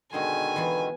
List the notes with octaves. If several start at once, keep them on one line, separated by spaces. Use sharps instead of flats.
B2 D3 D#3 G#3 D#4 C5 G#5
E3 B3 F4